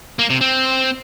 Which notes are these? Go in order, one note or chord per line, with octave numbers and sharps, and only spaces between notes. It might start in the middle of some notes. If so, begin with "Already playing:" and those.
A#3
C3
C4